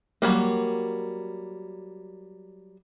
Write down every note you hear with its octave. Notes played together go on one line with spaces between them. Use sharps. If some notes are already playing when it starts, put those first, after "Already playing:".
F#3 G3 A#3